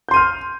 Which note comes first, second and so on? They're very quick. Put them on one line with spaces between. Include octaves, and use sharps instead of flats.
G6 C6 D#7 F6